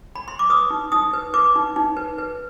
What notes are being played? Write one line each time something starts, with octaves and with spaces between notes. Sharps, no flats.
B5
C6
D6
B4 D#6
D#4
D#4 D#6
B4
B4 D6
D#4
D#4
B4
B4